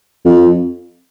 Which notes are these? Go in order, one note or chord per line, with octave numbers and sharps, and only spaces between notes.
F2